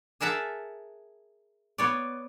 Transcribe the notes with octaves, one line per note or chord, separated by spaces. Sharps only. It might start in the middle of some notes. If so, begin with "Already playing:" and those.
G#4 A#4 E5 F#5 A5
B3 C#5 D5